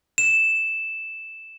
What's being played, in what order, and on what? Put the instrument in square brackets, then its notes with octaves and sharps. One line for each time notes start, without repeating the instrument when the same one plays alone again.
[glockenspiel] E7